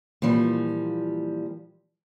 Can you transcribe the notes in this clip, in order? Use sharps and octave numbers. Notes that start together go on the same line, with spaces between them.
A#2 E3 F3 G3